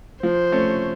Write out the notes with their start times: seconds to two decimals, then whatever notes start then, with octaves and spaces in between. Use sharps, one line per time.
0.23 F3 C5
0.52 A3 C#4